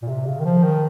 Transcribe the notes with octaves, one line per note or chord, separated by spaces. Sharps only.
A#2
C3
C#3
D#3
F3
D#3